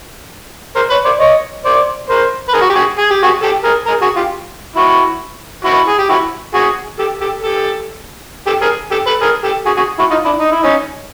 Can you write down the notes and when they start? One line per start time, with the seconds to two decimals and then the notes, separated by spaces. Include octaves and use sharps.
0.76 A#4 C5
0.90 B4 C#5
1.05 C5 D5
1.20 C#5 D#5
1.65 C5 D5
2.09 A#4 C5
2.49 B4
2.53 G#4 A#4
2.61 F#4
2.69 G4
2.75 F#4 G#4
2.99 G#4
3.11 G4
3.23 F#4 G#4
3.43 G4 A4
3.64 G#4 A#4
3.87 G#4 A#4
4.02 F#4 G#4
4.16 F4 G4
4.76 E4 F#4
5.65 E4 F#4
5.88 G#4
5.98 G4
6.09 E4 F#4
6.54 F#4 G#4
6.99 G4 A4
7.21 G4 A4
7.43 G4 A4
8.47 G4 A4
8.62 G#4 A#4
8.91 G4 A4
9.07 A4 B4
9.22 G#4 A#4
9.43 G4 A4
9.66 F#4 G#4
9.77 F#4 G#4
9.99 E4 F#4
10.10 D#4 F4
10.25 D4 E4
10.39 D#4
10.52 E4
10.62 C#4 D#4